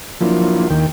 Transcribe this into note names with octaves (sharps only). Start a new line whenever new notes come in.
F3 F#3 A#3 D4 E4 F4
D#2 D#3 A#3 G5